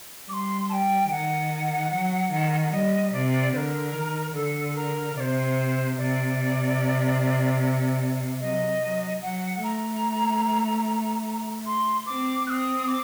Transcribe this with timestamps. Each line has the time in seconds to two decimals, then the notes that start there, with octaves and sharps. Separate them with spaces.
0.29 G3 C6 D6
0.69 A5
0.72 G5
1.10 D#3 F#5
1.92 F#3
2.31 D#3
2.64 F#5
2.72 G3 D#5
3.13 C3 D5
3.53 D3 A#4 C5
3.94 D#3
4.35 D3 A4
4.75 A#4
5.16 C3 D5
5.20 C5
5.98 C3 D5
8.40 F#3 D#5
8.82 F#3
9.22 F#3 F#5
9.62 A3 A#5
11.66 C6
12.06 C4 D6
12.47 C4 D#6 F#6
12.87 D6